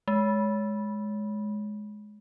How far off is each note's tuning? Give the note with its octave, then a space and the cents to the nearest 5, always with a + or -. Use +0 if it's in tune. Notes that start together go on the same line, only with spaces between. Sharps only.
G#3 +15